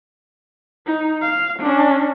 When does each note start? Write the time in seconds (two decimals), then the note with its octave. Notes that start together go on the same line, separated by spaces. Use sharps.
0.86 D#4
1.22 F5
1.59 C#4 D4